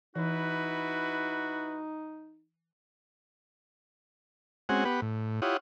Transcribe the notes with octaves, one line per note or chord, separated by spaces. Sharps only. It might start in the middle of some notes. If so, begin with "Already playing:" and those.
E3 D#4 E4 F#4 B4
G#3 C4 C#4 F#4 F#5 G#5
B3 G4 B4 F#5
A2
E4 F4 G4 C#5 F#5 D#6